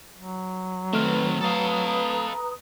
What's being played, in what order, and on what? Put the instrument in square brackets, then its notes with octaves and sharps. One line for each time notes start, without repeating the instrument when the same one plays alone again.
[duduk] F#3
[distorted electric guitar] D#3 C4 [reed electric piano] A3 F6 [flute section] B4
[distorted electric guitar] A4 F5 [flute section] B4 A#5 D#6